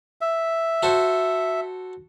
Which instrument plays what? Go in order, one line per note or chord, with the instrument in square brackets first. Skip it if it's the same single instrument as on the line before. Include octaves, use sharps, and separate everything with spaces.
[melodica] E5
[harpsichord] F#4 A4 C5